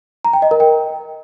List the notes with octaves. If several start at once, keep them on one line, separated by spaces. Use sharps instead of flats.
A#5
G5
D#5
A#4
G5